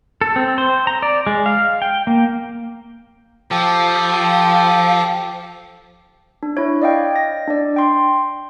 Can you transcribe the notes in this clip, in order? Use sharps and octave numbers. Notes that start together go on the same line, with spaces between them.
A4
C4
C5
A#5
D5
G#3
F5
G5
A#3
F3 G4 A4
D4
E4 C#5
D5 D#5 F5 G5
A#6
D4 D5
G5 C6